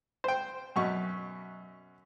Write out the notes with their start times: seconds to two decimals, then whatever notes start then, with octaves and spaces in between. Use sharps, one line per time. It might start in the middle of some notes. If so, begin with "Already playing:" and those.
0.24 C5 G5
0.76 F#2 B2 C#6